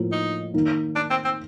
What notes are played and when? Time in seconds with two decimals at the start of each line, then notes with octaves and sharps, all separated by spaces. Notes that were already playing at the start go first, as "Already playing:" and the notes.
Already playing: A2 F3 A#3 F4
0.12 D#4
0.54 D#3 A#3 D#4
0.96 D4
1.10 C4
1.25 C4